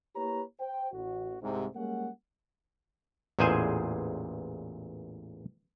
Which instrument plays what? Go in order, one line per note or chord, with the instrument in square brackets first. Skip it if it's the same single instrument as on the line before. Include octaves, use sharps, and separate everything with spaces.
[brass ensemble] A#3 E4 G4 B4 C#5 A#5
C5 G5
A1 F#4
C2 G#2 C3
G3 G#3 A#3 C#4 F#5
[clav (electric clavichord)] A1 E2 A#2 G#4 C5 G#5